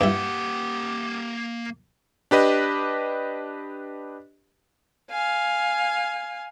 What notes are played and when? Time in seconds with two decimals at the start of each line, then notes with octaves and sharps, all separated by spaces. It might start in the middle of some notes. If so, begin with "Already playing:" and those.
0.01 G2 A#3 E4 G4 F#5
2.31 D4 G4 B4 D#5
5.10 F5 G#5